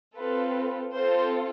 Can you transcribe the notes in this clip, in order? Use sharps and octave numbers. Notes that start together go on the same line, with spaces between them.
C4 F4 A4 B4
C4 F4 A4 C5